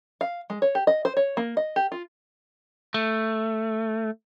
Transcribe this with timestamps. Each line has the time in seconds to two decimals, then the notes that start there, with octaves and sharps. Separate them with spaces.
0.21 F5
0.50 G#3
0.62 C#5
0.75 G4
0.87 D#5
1.05 C5
1.17 C#5
1.37 A#3
1.57 D#5
1.76 G4
1.92 F4
2.94 A3